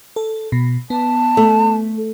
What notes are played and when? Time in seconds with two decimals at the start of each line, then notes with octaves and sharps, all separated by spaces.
0.16 A4
0.52 B2
0.90 B3 A5
1.37 A3